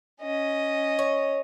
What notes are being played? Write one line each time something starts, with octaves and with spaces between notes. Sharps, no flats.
C#4 D#5
C#5